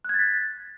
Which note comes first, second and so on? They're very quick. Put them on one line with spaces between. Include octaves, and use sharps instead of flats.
F#6 G#6 A6 B6